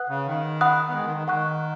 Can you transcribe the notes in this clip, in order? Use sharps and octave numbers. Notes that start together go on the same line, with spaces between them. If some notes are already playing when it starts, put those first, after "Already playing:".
Already playing: B4 F#5 D#6 F#6
C#3
D#3
F#5 B5 D#6 F#6
B3
G#3
D#3
D#3
D#3 F#5 C#6 F#6